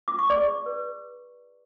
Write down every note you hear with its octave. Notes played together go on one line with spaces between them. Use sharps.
F4 D6
C#6
D5 D6
G#4
B4